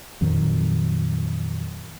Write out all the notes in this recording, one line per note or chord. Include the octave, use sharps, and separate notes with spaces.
F2 A#2 D#3 F#3